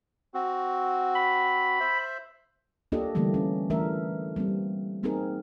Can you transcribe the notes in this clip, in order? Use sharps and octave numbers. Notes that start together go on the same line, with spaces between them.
C4 F#4
B5
C5 E5
A#3 D4 F4 G4 A4 D#5
D3 E3 G3 A3 A#3
C#4
E3 A3 D4 A#4 E5
G3 A#3 C4
A#3 C4 D#4 G#4 A#4